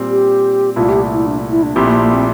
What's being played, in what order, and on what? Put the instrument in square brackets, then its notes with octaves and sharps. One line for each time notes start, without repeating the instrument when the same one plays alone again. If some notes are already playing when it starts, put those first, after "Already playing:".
Already playing: [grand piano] A#2 G3 C4
[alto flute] G4
[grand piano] C2 A#2 A3 E4 [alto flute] F4
[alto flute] G4
E4
D4
E4
D4
[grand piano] A#1 A#2 A3 E4 G4 [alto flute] C4
[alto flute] A#3
A#3
C4